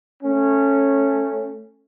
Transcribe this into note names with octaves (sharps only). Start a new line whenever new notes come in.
A3 C#4